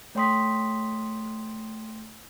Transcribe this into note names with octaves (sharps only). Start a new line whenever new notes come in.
A3 C#5 G5 C6 D#6 B6